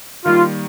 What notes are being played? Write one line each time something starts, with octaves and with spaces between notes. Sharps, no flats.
D#3 G3 A#3 F4